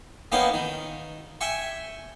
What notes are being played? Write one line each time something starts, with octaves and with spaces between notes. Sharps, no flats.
A#3 B3 C#4 D#4 F#5 G5
D#3
E5 G5 G#5 C#6